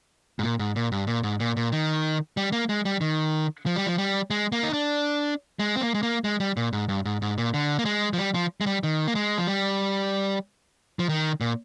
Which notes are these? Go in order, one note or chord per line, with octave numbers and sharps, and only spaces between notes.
G#2
A#2
G#2
A#2
G2
A#2
G#2
A#2
A#2
D#3
G3
A#3
G#3
G3
D#3
F3
G3
F3
G3
G#3
A#3
D#4
D4
G#3
C4
A#3
G#3
A#3
G#3
G3
A#2
G#2
G2
G#2
G#2
A#2
D3
A#3
G#3
F3
G3
F3
G#3
G3
D#3
A#3
G#3
F3
G3
F3
D#3
A#2